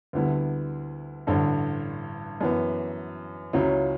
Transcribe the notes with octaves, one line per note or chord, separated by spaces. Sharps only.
D2 D3 G3 B3 E4
A1 G2 D3
F#2 E3 B3
C#2 C#3 F#3 C#4 E4